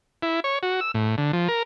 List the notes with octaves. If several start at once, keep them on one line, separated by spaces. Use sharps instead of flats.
E4
C#5
F#4
E6
A2
D3
F3
A#4